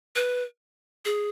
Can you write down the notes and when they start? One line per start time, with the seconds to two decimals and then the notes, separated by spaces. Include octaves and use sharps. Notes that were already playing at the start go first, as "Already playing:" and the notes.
0.16 B4
1.05 G#4